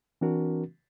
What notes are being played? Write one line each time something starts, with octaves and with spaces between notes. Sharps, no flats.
E3 C4 D4 F#4 A#4